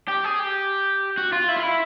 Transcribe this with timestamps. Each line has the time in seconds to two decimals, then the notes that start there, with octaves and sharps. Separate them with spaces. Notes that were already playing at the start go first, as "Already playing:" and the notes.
0.08 G4
0.24 G#4
0.40 G4
1.17 F#4
1.33 F4
1.48 E4
1.57 F4
1.63 E4